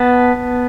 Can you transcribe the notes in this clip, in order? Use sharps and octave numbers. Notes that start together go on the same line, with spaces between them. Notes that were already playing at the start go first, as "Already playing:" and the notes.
Already playing: B3 A5